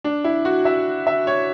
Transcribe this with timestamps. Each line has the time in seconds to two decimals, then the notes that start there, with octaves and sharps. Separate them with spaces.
0.04 D4
0.24 E4
0.45 F#4
0.65 E5
1.07 E5
1.27 C#5